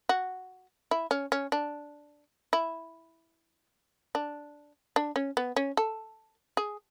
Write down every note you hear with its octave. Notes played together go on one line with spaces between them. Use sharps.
F#4
E4
C#4
C#4
D4
E4
D4
D4
C#4
B3
C#4
A4
G#4